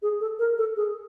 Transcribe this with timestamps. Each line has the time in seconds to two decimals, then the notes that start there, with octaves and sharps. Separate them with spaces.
0.02 G#4
0.21 A4
0.39 A#4
0.58 A4
0.76 G#4